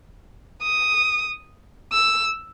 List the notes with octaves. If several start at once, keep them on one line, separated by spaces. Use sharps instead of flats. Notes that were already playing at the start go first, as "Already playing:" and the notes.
D#6
E6